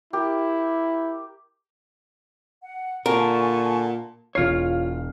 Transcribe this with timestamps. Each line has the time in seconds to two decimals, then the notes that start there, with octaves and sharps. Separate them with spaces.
0.13 E4 G4 A#4
2.62 F#5
3.06 A#2 D3 A#4 G#5 A5 C#6
4.35 E1 F4 C#5 F6 C7